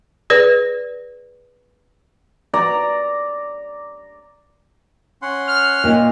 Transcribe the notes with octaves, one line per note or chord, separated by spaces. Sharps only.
G#4 B4 D5
D5 A#5
C#4 F#5 C6
F6
A#2 A#3 D#4